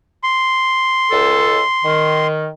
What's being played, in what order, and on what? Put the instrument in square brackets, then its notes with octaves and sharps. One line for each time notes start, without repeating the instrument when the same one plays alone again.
[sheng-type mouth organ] C6
[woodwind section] C#2 A4
D#3